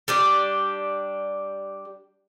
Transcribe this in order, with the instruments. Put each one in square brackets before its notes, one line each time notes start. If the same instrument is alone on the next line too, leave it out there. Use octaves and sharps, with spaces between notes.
[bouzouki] G3 D4 G4